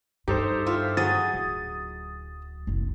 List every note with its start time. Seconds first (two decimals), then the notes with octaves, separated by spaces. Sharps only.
0.28 G2 D#4 G4 A4 C5
0.66 F4 E5
0.97 F#3 G#4 D#5 D#6 A6
1.34 D1
2.67 F#1 C2